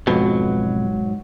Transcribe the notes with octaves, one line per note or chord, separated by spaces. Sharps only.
B1 F2 G#2 B2 F#3